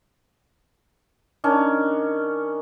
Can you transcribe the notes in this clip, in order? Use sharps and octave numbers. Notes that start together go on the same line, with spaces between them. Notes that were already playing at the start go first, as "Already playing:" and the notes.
D#3 C#4 D4